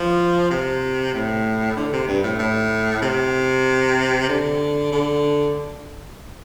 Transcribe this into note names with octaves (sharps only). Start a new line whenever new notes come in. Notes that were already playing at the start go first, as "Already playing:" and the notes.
Already playing: F3
C3
A2
D3
C3
G2
A2
A2
C3
D3
D3